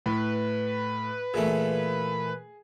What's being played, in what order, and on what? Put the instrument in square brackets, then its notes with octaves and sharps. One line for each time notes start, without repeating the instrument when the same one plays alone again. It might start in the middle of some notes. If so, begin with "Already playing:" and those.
[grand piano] A2 [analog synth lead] B4
[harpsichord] A#2 E3 A3 [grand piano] G#4